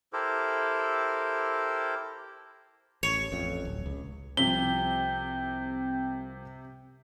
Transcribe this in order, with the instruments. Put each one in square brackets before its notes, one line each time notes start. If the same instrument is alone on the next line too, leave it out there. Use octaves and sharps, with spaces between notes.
[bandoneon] E4 G4 A4 A#4 C5
[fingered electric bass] A1 [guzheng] C#5
[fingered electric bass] A1 F2
D1
C#2
[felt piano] C2 F3 B6 [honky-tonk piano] C3 [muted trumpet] G5 [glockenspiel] G7